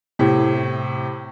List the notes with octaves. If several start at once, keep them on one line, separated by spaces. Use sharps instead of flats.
A2 C3